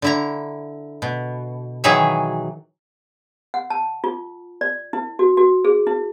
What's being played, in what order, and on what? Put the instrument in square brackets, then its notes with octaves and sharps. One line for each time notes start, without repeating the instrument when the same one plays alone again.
[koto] D3 E4 A#5
B2
D#3 E3 F#3 G#4 C#5 E5
[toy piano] F#5
A5
F4
D5
E4
F#4
F#4
G#4
E4